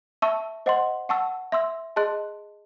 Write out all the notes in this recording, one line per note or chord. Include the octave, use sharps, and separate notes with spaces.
E5 A5 C#6 E6
C5 D#5 F#5 C6
F#5 A5 C#6 E6
E5 C6 E6
G#4 D#5 A5 C6 F#6